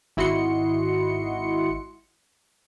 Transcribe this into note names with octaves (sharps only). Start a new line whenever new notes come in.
G#1 E4 F#4 D#5 C6 C#7